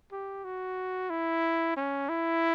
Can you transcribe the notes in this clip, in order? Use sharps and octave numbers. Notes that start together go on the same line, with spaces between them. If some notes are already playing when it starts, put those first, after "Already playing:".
G4
F#4
E4
C#4
E4